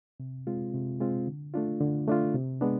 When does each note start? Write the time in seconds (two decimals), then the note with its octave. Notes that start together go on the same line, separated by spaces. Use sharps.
0.20 C3
0.47 G#3 C4 F4
0.74 C3
1.01 G#3 C4 F4
1.27 D3
1.54 A3 D4 F4
1.81 D3
2.07 A3 D4 F4
2.35 C3
2.61 G#3 B3 D4